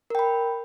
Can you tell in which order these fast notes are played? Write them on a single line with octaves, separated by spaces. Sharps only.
A#4 G5 B5